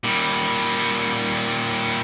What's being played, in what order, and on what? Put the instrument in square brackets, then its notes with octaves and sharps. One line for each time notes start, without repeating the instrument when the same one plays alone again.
[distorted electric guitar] A#2 G3